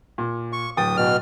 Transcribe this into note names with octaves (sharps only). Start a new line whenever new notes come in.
A#2
C#6
D1 G5 D#6 A6
B2 F6